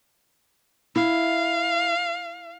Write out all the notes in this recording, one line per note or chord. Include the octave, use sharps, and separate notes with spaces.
E4 F5